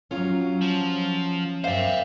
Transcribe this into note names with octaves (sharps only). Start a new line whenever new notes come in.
F#3 C#4 F4
F3
F#2 C5 D5 E5 F5